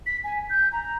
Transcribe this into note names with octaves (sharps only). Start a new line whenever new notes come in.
B6
G#5
G6
A#5